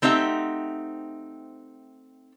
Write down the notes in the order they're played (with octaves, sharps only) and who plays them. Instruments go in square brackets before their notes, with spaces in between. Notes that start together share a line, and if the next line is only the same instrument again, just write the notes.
[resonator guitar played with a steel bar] A3 C4 D#4 G4 E5 F#5